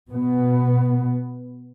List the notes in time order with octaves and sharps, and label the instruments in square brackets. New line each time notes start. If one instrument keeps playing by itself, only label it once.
[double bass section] B2 B3